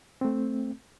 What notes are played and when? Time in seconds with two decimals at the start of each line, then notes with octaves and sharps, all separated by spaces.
0.21 A3 C4